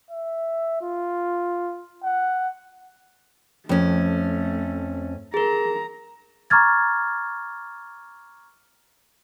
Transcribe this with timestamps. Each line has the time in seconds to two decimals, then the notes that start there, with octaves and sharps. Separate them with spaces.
0.10 E5
0.82 F4
2.04 F#5
3.69 F2 A3 C#4
5.34 G#4 A#4 A#5
6.50 A#5 C#6 D6 F6 G#6 A6